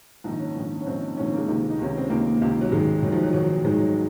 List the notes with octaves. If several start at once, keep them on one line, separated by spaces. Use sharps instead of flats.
A#1 G#2 D#3 D#4
C#4
A#1 G#2 D#3
C#4
A#1 G#2 D#3 C4
A#1 G#2 D#3 C#4
C4
A#3
G#3
C#2 C3 D#3
D#4
C#2 C3 D#3 C#4
C4
C#2 C3 D#3 A#3
C#2 C3 D#3
F#3
G#1 G#2 D#3 G#3
G#1 G#2 D#3 F#3
F3
F#3
G#1 G#2 D#3 F#3
G#1 G#2 D#3 G#3
F#3